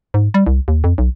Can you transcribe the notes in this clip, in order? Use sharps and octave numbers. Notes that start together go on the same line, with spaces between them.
G#2
G3
C2
D#2
F2
B1